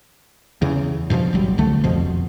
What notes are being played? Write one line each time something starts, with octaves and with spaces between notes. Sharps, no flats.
E2 C#3
G2 B2 D3 F3
G#1 F#3 G3
C2 D3 A3
E1 F2 B2 F3